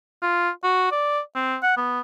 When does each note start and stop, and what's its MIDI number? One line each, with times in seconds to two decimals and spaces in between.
0.22 0.49 65
0.64 0.88 66
0.92 1.20 74
1.35 1.57 60
1.63 1.72 78
1.77 2.01 59